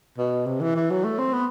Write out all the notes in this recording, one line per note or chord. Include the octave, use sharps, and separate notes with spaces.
B2
C3
E3
E3
F#3
A3
C4
B3